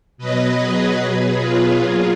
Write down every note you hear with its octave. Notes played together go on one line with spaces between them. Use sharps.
B2 F#3 B4 D#5
G#4 B4
B2 F#3 G#4 B4
F4 G#4
A#2 F#3